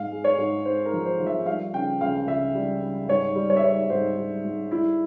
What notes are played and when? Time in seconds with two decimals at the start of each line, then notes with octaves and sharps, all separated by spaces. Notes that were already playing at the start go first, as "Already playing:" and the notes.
Already playing: G#2 F5
0.12 G#3
0.24 C#5
0.38 G#2
0.65 G#3 C5
0.86 A#4
0.93 F3
1.06 C5
1.20 F3
1.26 E5
1.46 G3 F5
1.73 C#3 G5
2.01 C#2 F5
2.27 C#2 E5
2.55 G3
2.82 G3
3.08 G#2 C#5
3.35 G3
3.50 C#5
3.57 E5
3.63 G3 C#5
3.90 G#2 C5
4.17 G3
4.44 G#2
4.71 G3 E4